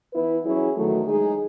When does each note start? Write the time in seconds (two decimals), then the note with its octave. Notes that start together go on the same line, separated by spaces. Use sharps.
0.13 E3 B3 E4 B4
0.44 F#3 C#4 E4 G#4 C#5
0.76 E2 D#3 F#3 A3
1.08 G#3 D#4 G#4